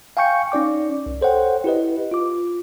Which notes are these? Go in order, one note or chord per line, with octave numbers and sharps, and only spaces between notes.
F5 G5 G#5 C#6 G6 C#7
C#4 D#4 D5 D6
C2
A4 C5 C#5 F#5 G5
E4 G4 B4 D#5
F4 D6